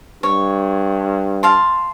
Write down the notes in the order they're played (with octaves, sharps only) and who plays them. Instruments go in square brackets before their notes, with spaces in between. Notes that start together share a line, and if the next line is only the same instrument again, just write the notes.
[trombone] G2 [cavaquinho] C#5
[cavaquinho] F5 A5 C6